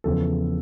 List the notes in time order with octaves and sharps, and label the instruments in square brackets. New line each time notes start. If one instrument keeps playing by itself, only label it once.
[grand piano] E2 C#3 F3 A4